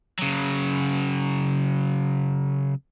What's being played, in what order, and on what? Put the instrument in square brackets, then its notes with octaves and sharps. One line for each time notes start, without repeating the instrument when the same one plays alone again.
[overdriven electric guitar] C#3 F#3